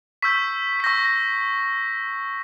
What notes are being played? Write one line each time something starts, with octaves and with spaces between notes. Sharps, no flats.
C#6 E6 G6 B6
B6
C#6 E6 G6 A#6
A#6